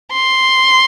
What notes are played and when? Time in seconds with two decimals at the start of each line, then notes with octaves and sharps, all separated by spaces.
0.12 C6